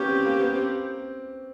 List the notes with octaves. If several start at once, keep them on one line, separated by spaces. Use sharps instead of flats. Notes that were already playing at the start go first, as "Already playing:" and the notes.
Already playing: A#3 B3 C#4 G4
C4
A#3
B3
C4